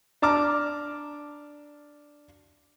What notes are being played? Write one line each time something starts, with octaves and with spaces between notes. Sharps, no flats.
D4 A5 A#5 D6 F6